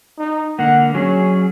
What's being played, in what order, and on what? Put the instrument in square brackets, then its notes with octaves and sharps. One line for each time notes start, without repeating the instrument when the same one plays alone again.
[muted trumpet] D#4
[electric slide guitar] D3 A#3 [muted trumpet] F#5
[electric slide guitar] F#3 G#4 [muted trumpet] C#4